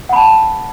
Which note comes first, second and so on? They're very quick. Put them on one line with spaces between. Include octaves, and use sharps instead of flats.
F#5 B5 A5